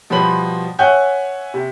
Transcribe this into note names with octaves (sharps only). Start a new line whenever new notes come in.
B2 F3 G3 C5 B5 F#7
C#5 E5 F#5 G#5 F#6 G6
C3